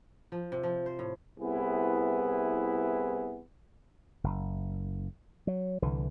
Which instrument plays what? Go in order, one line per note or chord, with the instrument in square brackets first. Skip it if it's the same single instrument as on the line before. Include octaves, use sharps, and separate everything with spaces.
[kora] F3
C3
F3
C5
A2
[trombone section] C2 B3 E4 G#4 B4
[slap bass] F#1
F#3
C2 D3 E3